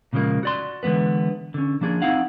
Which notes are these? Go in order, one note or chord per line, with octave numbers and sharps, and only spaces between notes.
A#2 C#3 F3 G#3 A#3
F#4 D5 C6
D3 E3 G#3 B3 B4
D3 C#4
F3 A#3 D4 G#4
C4 D#4 E4 F5 F#5